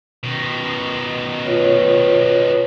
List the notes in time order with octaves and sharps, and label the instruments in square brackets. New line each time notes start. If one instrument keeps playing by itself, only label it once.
[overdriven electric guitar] B2 D#3
[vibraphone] F4 B4 C#5